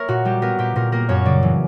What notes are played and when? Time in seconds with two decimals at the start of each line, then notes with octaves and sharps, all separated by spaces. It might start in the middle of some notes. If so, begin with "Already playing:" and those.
Already playing: A#3 A#4 C#5 E5
0.08 A#2 F#4
0.25 G3 G4
0.42 B3 A#4
0.59 A#2 G4
0.76 A#2 A#4
0.92 A#3 A#4
1.09 F#2 C#5
1.26 C#3 D5
1.43 E3